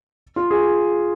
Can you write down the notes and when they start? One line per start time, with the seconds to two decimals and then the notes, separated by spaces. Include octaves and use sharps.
0.36 F4
0.51 G#4